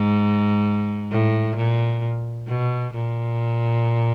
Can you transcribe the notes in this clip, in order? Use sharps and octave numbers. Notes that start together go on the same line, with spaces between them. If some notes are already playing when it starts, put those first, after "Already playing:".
Already playing: G#2
A2
A#2
B2
A#2